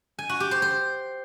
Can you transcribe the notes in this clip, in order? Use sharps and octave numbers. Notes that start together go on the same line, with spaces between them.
G#5
F#4
G4
C5
C5